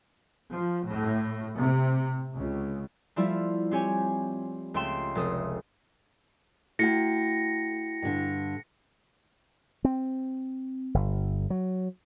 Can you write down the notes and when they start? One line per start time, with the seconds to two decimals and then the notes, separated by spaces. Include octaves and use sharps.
0.52 F3
0.86 A2
1.59 C3
2.35 C#2
3.16 F3 G3 A3 E4 F4
3.71 C4 G4 C#5 G#5
4.74 C#2 A3 G5 C6 E7
5.15 F1 A4 D#6
6.79 A3 E4 F#4 G5 A#6 C#7
8.02 G2 D3
9.84 C4
10.94 G1
11.50 F#3